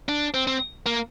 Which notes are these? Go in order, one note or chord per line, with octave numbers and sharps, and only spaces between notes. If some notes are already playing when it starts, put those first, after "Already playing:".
D4
C4
C4
A#3